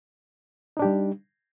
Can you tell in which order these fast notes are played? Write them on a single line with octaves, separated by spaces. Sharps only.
D#4 D4 G4 G3